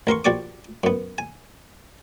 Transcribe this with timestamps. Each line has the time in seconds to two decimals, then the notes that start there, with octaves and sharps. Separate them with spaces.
0.07 A1 A#4 C6 C#6
0.25 A#1 F#4 G4 D5 C#6 D6
0.84 F#2 B3
1.18 G#5